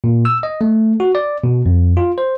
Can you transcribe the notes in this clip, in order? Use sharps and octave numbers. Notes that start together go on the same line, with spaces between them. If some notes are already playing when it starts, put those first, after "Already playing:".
A#2
E6
D#5
A3
F#4
D5
B2
F2
F4
C5